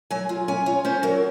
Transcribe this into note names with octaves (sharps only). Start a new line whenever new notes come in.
F#3 G#5
F4
C#4 G#5
F4 C#5
C#4 C5
F#3 A#4